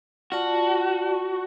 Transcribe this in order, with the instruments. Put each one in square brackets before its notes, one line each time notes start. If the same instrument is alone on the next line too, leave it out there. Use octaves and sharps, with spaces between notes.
[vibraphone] F4 D5 A5 [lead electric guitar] F#4